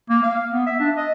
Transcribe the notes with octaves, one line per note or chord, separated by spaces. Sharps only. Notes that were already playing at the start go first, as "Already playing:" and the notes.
A#3
F5
B3
E5
D4
D#5